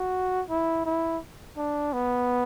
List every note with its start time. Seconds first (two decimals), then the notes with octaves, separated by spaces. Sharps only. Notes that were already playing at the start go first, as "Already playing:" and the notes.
Already playing: F#4
0.50 E4
0.86 E4
1.58 D4
1.93 B3